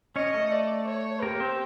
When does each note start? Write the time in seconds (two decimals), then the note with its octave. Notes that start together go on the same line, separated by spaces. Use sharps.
0.16 C#4 C#5 D#5
0.34 A3 A4
0.51 D5
0.87 C#5
1.23 A#3 G4 A#4
1.40 C4 C5